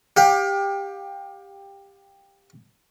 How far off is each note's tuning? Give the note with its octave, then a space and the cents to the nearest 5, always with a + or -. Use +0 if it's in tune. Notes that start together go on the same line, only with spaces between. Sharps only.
G4 +15 F5 +35